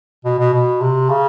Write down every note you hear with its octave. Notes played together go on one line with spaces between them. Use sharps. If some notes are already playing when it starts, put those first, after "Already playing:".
B2
B2
B2
C3
C#3